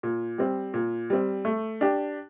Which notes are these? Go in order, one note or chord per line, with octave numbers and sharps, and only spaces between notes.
A#2
G3 C4
A#2
G3 C4
A3
D4 G4